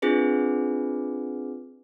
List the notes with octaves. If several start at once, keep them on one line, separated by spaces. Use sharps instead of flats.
C4 D4 F4 G#4 B4